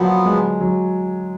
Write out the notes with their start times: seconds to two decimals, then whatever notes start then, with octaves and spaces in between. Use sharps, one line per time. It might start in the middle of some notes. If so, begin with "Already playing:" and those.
Already playing: A#2 F3 F#3 B3
0.25 G#3
0.60 F#3